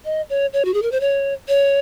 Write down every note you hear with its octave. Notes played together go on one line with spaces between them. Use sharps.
D#5
C#5
C#5
F#4
G#4
A#4
C5
C#5
C#5